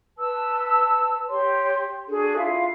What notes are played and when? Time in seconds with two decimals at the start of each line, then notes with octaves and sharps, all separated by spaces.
0.18 B4 A5 E6
1.29 G4 C#5 C6
2.09 D4 F#4 G#4 A4
2.37 E4 F4 E5 F5